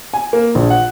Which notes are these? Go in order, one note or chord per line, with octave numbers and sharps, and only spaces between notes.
G#5
A#3
A#1
F#5